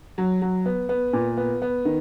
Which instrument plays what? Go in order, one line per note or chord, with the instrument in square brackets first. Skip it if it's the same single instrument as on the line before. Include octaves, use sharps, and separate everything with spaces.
[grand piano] F#3
F#3
B3
B3
A#2
B3
B3
D#3